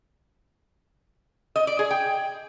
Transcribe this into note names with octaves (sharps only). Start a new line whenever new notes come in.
D#5
D5
G#4
G5